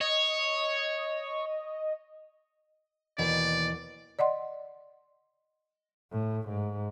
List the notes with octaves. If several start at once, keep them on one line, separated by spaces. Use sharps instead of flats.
C#5 D#5
D#2 B2 E3 D5
D5 D#5 F#5 C6
A2
G#2